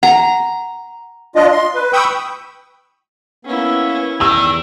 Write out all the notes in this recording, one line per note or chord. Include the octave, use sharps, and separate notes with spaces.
F#5 A#5
D4 F4 D#5
C6
B4
G5 B5 C#6 D#6 E6 G6
A#3 B3 C#4 E4
E2 D#3 E6